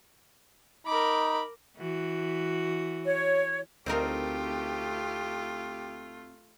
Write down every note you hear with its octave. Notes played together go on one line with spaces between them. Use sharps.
D#4 A#4 B5 D6
E3 F#4
C#5
D2 A3 C4 D#4 F4 G4 A#4